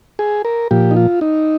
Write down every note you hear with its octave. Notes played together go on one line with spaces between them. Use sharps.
G#4
A#4
A#2 F3 G4
D#4
F4
D#4